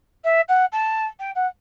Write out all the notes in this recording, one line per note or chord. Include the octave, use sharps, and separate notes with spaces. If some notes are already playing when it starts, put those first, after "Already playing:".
E5
F#5
A5
G5
F#5